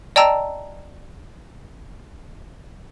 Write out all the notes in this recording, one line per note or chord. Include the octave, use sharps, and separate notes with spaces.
D5 D#5 G5 A5 A#5 E6